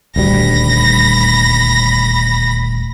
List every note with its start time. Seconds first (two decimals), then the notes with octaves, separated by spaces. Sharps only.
0.16 D#1 D2 G3 B5 A#6